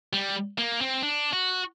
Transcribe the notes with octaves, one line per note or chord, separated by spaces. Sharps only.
G3
A#3
C4
D4
F#4